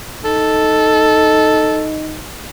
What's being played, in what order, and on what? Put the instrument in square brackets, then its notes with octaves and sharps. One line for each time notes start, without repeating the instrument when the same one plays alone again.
[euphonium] D#4 [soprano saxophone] A4